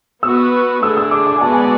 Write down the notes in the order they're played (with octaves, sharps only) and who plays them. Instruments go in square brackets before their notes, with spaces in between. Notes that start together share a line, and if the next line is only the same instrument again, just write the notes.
[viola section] B3 F#4 B4 [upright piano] E6
[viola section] D3 A3 D4 G#4 [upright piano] E6
[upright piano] E6
D6
D6
G#5
[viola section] G#3 B3 F#4 B4 D5 [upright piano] A5
[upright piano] G#5
A5